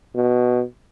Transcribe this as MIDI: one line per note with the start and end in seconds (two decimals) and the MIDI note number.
0.15 0.63 47